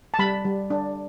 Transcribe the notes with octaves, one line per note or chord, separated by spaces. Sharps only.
A5
G3 B5
G3
D4